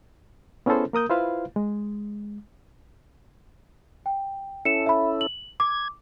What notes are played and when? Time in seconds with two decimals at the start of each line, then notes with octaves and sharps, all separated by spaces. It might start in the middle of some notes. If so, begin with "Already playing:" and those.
0.66 B3 C#4 E4 G#4 A4 C5
0.93 A#3 A#4 D#6 G6
1.10 E4 F4 B4 C5 F5
1.56 G#3
4.06 G5
4.65 C#4 E4 A4 C#7 E7
4.86 E5 B5
5.21 F#7
5.60 D6 G#6